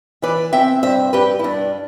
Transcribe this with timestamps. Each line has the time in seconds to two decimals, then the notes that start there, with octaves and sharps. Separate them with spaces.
0.22 E3 B4 D5
0.53 C4 E5 G5
0.83 G2 C5 E5
1.13 G2 G4 B4
1.39 E4
1.44 G2 D4